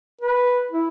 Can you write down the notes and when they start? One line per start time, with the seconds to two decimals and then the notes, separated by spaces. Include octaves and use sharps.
0.21 B4
0.71 E4